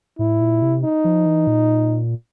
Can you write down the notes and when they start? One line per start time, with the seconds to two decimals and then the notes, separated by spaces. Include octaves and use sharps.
0.19 A2 E4
0.41 A#2
0.62 C3
0.83 D#4
1.04 F3
1.26 E3
1.47 A#2